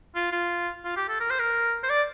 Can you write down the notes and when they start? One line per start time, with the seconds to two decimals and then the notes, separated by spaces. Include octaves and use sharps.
0.15 F4
0.32 F4
0.85 F4
0.97 G4
1.09 A4
1.20 A#4
1.30 C5
1.39 A#4
1.83 C5
1.90 D5